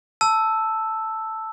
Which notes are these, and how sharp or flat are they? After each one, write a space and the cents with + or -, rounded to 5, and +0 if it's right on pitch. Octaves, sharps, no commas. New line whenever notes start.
A5 +5 E6 +0